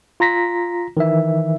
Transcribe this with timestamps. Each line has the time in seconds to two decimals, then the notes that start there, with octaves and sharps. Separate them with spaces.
0.20 F4 A#5 A#6 B6
0.97 D#3 E3 E5